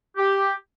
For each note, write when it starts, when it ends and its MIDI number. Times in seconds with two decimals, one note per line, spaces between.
0.17 0.51 67